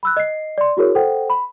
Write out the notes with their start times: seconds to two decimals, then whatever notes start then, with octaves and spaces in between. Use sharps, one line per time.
0.03 B5 E6 F#6
0.17 D#5 C7
0.58 D5 C6
0.77 E4 F#4 G#4 A#4 C#5
0.95 A4 C5 F#5 G5
1.30 B5